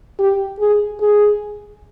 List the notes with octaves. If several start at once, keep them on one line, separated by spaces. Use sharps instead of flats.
G4
G#4
G#4